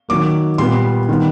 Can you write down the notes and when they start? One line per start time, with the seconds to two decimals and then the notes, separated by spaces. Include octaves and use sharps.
0.09 D#3 F#3 A#3 D6
0.58 A#2 G3 B3 C6
1.09 D#3 G3 B3